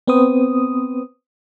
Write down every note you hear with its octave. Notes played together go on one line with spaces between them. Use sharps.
B3 C4 B4 C5 D#6